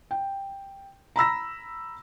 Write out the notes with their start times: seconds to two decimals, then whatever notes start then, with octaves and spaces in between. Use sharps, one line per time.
0.11 G5
1.16 A#5 B5 E6 A#6